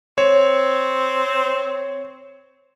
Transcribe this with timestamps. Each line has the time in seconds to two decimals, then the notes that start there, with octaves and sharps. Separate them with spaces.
0.18 C4 C#5